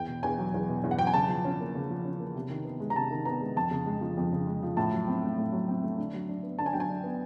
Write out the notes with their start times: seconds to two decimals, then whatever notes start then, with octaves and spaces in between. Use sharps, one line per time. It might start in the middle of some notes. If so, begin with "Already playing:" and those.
Already playing: E2 G5
0.08 B2
0.23 E2 G#5
0.38 F#3
0.54 E2
0.69 B2
0.84 E2
0.91 F#5
0.99 F#3 G5
1.07 G#5
1.14 C#3 A5
1.29 F3
1.45 C#4
1.60 A#3
1.75 C#3
1.90 F3
2.05 C#4
2.20 A#3
2.36 C3
2.50 D#3
2.65 B3
2.80 G#3
2.90 A#5
2.96 C3 A5
3.11 D#3
3.25 B3 A#5
3.41 G#3
3.56 F2 A5
3.71 C#3
3.86 G#3
4.01 F3
4.17 F2
4.33 C#3
4.47 G#3
4.63 F3
4.77 A2 A5
4.93 F#3
5.07 C4
5.23 A3
5.38 A2
5.52 F#3
5.68 C4
5.83 A3
5.98 D3
6.14 F#3
6.29 D4
6.43 B3
6.59 D3 A5
6.66 G#5
6.73 F#3 G5
6.80 G#5
6.89 D4
7.04 B3